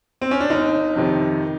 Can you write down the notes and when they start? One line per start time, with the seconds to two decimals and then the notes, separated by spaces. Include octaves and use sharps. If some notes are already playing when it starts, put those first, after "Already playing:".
0.22 C4
0.31 C#4
0.41 D4
0.50 G1 D#4
0.96 F2 C3 D#3